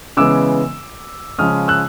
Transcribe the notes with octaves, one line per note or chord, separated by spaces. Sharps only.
C#3 E3 G#3 B3 D6 E6
C#3 F3 G#3 C#4 D#6 F6
E6 F#6